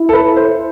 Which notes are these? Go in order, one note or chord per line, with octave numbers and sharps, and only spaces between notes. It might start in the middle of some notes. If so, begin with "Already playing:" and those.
Already playing: E4
A4
B4
C5